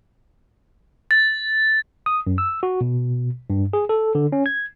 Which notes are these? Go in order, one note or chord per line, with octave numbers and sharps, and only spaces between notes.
A6
D#6
F#2
E6
F#4
B2
G2
G#4
A4
D3
C#4
G#6